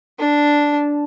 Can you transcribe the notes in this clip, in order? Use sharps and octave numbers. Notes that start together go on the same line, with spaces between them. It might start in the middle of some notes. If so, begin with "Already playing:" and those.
D4